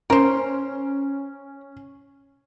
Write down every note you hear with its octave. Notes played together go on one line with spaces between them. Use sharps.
C#4 A#4 C5